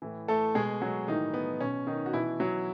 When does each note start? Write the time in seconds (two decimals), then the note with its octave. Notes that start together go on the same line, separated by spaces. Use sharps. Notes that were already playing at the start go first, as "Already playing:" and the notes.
0.02 A2 E3
0.28 A3 A4
0.55 B2 G#3 G#4
0.81 F#3 F#4
1.08 A2 D#3 E3 D#4
1.34 B3
1.60 B2 C#4
1.87 D#3 D#4
2.06 F#4
2.13 B2 E3 E4
2.40 F#3 F#4